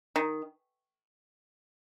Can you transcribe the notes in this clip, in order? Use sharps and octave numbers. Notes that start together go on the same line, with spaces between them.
D#3